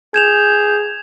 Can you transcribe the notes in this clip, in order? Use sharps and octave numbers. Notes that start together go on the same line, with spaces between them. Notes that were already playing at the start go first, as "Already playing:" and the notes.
G#4 G6 G#6 E7 F7